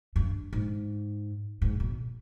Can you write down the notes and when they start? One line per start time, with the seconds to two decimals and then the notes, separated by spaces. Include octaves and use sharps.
0.16 G2
0.53 G#2
1.62 G#2
1.80 B2